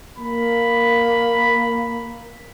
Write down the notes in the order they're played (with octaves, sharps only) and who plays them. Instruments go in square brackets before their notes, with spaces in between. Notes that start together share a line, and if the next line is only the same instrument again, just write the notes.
[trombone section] A#3 [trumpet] B5